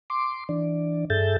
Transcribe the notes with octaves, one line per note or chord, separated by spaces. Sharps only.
C6 D6
E3 D4 D5
G2 G#4 A4 E5 G6 A6